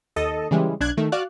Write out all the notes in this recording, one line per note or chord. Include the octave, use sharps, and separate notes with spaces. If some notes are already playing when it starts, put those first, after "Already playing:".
D#2 A4 D#5
C#3 E3 G3 G#3
B1 D4 F#6 G#6
D#3 A3
F#4 D5 F5 F#6